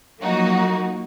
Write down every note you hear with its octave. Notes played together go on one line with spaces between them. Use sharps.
F3 F#3 A#3 D#4 F#4